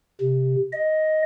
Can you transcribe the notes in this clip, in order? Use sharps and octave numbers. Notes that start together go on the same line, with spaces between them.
C3
D#5